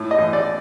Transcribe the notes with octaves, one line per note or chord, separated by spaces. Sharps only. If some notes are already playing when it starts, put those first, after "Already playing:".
Already playing: A2
D#5
A1
D5